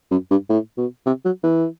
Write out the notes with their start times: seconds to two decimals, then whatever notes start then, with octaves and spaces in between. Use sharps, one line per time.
0.11 F#2
0.31 G2
0.50 A2
0.78 B2
1.06 C3
1.25 F#3
1.43 E3